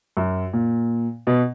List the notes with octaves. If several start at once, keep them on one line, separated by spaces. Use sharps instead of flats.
F#2
A#2
B2